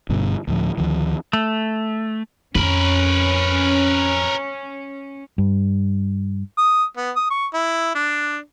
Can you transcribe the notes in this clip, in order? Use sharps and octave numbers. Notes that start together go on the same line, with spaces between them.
G1 G2 B2 D3
D2 A2 F3
D2 D#3 F3
A3
F2 C#4 A#4 B4
G2
D#6
B3
D#6
C#6
E4
D4